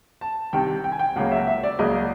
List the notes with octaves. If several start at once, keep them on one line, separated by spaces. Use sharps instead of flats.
A5
C2 C3 D#3 G5
G5
G#5
G5
C#2 C#3 F#3 A#3 F#5
E5
E5
D5
C#2 C#3 F#3 A#3 D#5